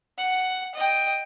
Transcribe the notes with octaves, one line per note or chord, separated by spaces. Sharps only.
F#5
D#5 G5